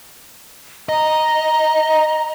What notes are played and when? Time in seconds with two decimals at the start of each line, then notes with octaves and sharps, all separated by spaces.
0.89 D#5 A#5